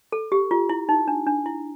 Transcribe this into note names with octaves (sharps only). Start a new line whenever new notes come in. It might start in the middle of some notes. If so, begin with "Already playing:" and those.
A4
G4
F4
E4
D#4
D4
D4
E4